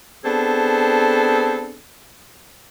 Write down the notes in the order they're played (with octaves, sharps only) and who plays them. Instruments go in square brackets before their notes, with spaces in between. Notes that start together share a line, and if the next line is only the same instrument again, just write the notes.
[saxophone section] B3 C4 D4 G#4 A4